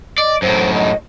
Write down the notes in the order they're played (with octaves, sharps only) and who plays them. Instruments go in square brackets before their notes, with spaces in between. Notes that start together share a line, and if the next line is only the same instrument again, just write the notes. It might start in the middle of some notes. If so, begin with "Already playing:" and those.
[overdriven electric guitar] D5 [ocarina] D#5
[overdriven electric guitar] F#2 A2 [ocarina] C5
[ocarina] D#5